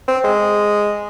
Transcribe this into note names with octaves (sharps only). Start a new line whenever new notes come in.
C4
G#3